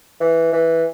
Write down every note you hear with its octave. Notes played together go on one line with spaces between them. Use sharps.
E3
E3